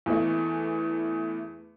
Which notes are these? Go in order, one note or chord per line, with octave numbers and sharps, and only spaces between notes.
E2 E3 A3